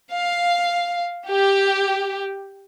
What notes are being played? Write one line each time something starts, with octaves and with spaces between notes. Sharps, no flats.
F5
G4